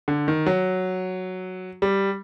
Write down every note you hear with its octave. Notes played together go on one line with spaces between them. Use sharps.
D3
D#3
F#3
G3